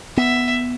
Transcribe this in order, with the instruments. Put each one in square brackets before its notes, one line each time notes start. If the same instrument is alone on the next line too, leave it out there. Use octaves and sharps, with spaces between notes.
[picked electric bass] B3 [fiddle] E5